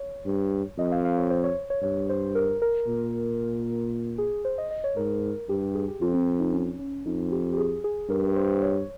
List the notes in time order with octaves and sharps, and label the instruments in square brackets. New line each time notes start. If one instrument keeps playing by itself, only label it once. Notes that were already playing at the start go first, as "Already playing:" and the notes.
Already playing: [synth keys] C#5
[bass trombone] G2
[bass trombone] F2 [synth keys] D#5
[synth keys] F5
F5
C#5
C5
C#5
C#5
[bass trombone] G2 [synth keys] C#5
[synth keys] C5
A#4
A#4
[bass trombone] A#2
[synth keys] G#4
C5
D#5
D#5
C#5
[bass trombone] G#2 [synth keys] A#4
[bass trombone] G2 [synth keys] G4
[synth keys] G4
G#4
G4
[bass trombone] F2 [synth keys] F4
[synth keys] C4
D#4
C#4
C#4
[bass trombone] F2 [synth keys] D#4
[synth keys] G4
G4
G#4
G#4
[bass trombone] G2 [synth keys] A#4
[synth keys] C5
C#5